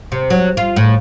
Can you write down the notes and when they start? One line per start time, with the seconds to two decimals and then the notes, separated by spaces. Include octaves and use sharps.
0.12 C3
0.30 F#3
0.57 F4
0.76 A2